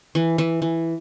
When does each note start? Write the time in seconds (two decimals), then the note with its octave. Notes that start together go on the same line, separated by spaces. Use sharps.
0.15 E3
0.38 E3
0.62 E3